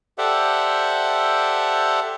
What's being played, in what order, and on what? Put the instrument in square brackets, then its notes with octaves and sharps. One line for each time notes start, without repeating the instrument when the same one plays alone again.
[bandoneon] G4 A4 C5 D5 E5 F#5